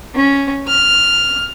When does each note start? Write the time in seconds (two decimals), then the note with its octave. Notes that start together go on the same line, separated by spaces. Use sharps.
0.15 C#4
0.68 F6